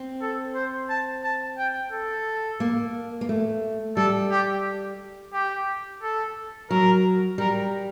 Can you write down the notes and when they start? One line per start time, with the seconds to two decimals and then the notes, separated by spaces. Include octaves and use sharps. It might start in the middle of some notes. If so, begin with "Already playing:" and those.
Already playing: C4
0.21 A4
0.55 C5
0.89 A5
1.24 A5
1.58 G5
1.92 A4
2.60 A#3
3.21 A#3
3.29 A3
3.97 G3 A4
4.31 G4
5.33 G4
6.02 A4
6.70 F#3 A#4
7.38 G3 A#4